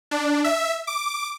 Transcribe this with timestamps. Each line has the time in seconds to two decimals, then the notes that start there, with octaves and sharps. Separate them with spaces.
0.11 D4
0.44 E5
0.87 D6